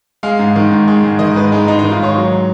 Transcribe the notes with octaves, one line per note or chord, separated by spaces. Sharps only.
G#3 F5
G#2
D#3
G#2
G#3
G#2
D#3 D#5
G#2 B4
G#3 D#4
G#2 D#4
D#4
D#3
F4
G#2 C#5
F#3